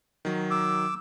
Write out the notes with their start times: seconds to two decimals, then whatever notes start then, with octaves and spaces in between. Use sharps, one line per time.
0.25 D#3 F#3
0.51 D6 E6